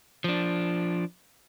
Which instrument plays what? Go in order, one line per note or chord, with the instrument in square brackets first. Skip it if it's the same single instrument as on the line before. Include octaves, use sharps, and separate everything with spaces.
[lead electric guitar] F3 D4